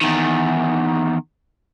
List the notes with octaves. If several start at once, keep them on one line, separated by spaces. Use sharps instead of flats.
E2 D#3